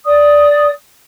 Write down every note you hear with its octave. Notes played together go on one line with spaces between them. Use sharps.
D5 D#6